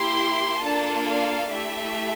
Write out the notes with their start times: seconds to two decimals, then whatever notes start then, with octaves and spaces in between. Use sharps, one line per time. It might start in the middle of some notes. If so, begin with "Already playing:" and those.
Already playing: A#3 E4 G4 C6
0.62 A#3 D4 F4 A4 A5
1.07 F5
1.52 A3 E4 G4 E5